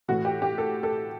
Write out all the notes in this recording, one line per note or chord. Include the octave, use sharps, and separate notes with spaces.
A2 E3 F#4
G4
G4
A4
A4